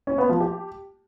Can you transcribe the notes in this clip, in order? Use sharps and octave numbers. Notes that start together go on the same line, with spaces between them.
C#4
B3
F3
G4